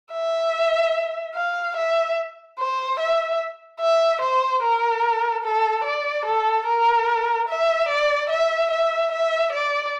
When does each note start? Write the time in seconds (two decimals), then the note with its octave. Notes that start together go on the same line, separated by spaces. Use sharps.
0.12 E5
1.35 F5
1.76 E5
2.59 C5
2.99 E5
3.80 E5
4.21 C5
4.62 A#4
5.43 A4
5.84 D5
6.25 A4
6.66 A#4
7.48 E5
7.88 D5
8.29 E5
8.71 E5
9.11 E5
9.52 D5